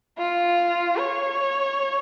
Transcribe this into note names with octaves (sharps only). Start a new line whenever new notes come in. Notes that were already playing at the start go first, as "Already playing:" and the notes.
F4
C#5